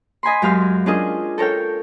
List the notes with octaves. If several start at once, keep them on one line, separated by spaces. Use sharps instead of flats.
D#5 G#5 B5 C6
F#2 G#3 G4 F5 C6 F6
C#4 D4 F4 G#4 A#4 D#5
A4 A#4 C#5 F5 G5